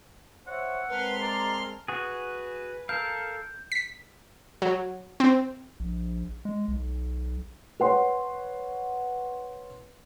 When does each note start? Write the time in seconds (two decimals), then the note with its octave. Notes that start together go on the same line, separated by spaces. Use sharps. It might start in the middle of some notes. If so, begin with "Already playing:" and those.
0.47 C5 C#5 E5 F#5
0.89 G#3 C4 A#4 B4 A5 C6 F6
1.22 D5 A#5
1.88 F#4 G#4 B4
2.89 A4 A#4 F5 G6
3.72 B6
4.62 F#3
5.20 C4
5.80 A#1
6.45 G#3
6.68 B1
7.80 B4 C#5 F#5 C6